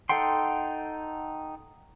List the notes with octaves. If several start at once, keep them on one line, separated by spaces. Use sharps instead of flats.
D#4 A4 F#5 G5 C6